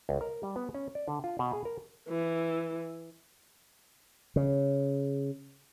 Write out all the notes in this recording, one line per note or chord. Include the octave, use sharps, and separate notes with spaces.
C#2
A#4
G3
B3
C#4
D5
D3
F4
B2
G#4
A#4
E3
C#3